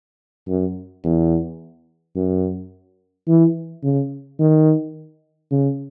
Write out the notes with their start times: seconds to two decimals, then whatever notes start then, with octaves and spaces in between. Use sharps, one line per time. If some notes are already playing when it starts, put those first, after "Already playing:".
0.48 F#2
1.04 E2
2.16 F#2
3.28 E3
3.84 C#3
4.40 D#3
5.51 C#3